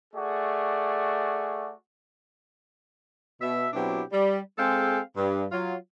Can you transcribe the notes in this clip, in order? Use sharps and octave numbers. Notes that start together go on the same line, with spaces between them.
A3 F#4 G#4 D5
B2 E5
B2 F#3 C4 D4 E4 G4
G3
G#3 C4 G#4 A4 F5 G5
G2
F#3 F4